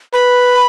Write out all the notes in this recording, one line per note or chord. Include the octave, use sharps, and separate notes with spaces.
B4 B5